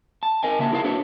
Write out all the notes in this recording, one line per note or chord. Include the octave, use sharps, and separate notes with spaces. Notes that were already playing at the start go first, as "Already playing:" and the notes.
A5
A#4 D#5 G#5
C#3 A#3 E5 A5
E4 G#4 A#4 F5 A5
D4 F#4 B4 C#5